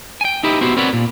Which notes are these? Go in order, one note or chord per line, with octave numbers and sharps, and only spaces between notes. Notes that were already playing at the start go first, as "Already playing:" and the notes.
G5 G#5
D#4 E4 G4 B4
B3 E4 F#4 G4 C5
C4 A#4 B4 C#5 D5 F#5
A#2